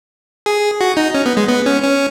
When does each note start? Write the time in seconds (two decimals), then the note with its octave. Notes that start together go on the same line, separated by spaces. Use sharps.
0.46 G#4
0.81 F#4
0.97 D#4
1.15 C#4
1.26 B3
1.37 G#3
1.48 B3
1.66 C#4
1.83 C#4